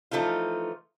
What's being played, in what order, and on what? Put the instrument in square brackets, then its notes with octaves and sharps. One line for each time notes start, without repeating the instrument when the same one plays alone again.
[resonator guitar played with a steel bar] E3 F3 A3 D#4 F4